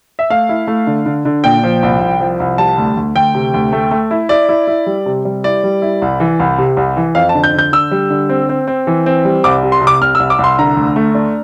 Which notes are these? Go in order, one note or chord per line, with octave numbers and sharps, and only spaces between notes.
E5
A3 F5
E4
A3
D3
D3
D3
A#2 G5
F3
C2
C2
F3
C2
G3 A5
D2
D2
D2 G5
C3
D2
A3
A3
E4
E4 D5
E4
E4
G3
C3
G3
E4 D5
G3
E4
C2
E3
C2
C3
C2
E3
F2 F5
A5
D3
G6
D3 G6
D3 E6
G3
D3
C4
C4
C4
E3
C4
G3
C2 D6
C3
C6
C3
D6
C2 F6
C2 E6
D6
C2
C6
D3 A#5
D2
A3
D4